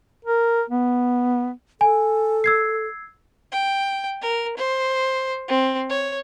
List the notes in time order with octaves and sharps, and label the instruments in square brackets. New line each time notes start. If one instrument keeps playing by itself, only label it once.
[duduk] A#4
B3
[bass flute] A4 [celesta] G#5
[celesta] E6 G#6 C7
[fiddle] G5
A#4
C5
C4
C#5